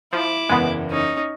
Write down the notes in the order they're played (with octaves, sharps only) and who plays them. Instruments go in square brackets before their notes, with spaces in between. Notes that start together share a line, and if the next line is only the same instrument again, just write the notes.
[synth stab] F3 [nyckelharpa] E4 D6
[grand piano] F#1 E2 [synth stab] G#3 B3
[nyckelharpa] C#4 D#4